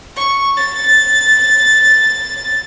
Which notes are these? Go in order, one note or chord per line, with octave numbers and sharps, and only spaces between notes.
C#6
A6